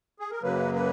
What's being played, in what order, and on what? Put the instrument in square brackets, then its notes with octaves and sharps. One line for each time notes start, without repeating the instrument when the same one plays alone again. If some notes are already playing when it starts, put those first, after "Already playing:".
[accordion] G#4
A#4
F#2 C#3 F#3 A#3 B4
B4